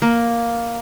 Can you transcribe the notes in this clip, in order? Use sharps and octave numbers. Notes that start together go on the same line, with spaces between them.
A#3